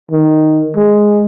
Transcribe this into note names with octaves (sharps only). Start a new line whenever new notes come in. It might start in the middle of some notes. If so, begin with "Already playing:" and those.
D#3
G#3